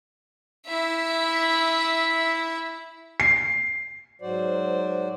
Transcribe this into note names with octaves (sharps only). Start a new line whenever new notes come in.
E4 E5
C7
G#2 F#3 F#4 C5 D5